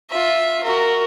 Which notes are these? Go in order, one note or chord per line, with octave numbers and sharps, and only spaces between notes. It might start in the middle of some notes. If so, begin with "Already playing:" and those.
F4 E5
F#4 A#4